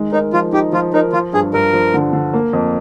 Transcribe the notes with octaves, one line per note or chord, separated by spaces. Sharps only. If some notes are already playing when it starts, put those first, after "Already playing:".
Already playing: D#3 G#3
D#4 A#4
F3 F4
D#4 G4
F3 F4
D#4 A#4
F3 F4
G2 G#4
G2 A#4
F3
D3
D3
A#3
F2